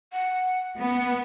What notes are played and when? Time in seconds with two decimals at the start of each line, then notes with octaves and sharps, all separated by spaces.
0.12 F#5
0.79 B3 F#5